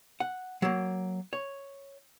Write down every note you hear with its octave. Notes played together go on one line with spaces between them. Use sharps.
F#5
F#3 A#3
C#5